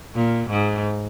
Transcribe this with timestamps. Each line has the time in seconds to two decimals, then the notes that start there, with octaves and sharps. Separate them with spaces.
0.15 A#2
0.49 G#2